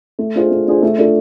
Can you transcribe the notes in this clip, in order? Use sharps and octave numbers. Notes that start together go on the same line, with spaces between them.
A3
D4 F4 G#4 C5
A3
D4 F4 G#4 C5
A3
D4 F4 A4